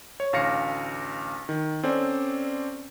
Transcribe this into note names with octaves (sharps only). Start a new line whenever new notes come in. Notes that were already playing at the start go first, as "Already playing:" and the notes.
C#5
A1 D2 F5 A#6 C#7
D#3
C4 C#4 A4 C5 D5